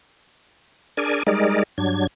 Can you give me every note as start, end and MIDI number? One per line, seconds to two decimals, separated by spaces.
0.97 1.23 62
0.97 1.23 68
0.97 1.23 70
0.97 1.23 74
0.97 1.23 80
1.27 1.63 55
1.27 1.63 56
1.27 1.63 63
1.27 1.63 68
1.27 1.63 70
1.27 1.63 74
1.78 2.07 43
1.78 2.07 54
1.78 2.07 62
1.78 2.07 92